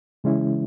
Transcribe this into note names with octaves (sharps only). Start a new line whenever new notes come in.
C#3 E3 G#3 C#4 E4